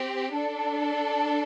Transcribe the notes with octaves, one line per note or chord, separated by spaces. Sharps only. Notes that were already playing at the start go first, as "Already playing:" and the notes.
Already playing: C4 G4
D4 A4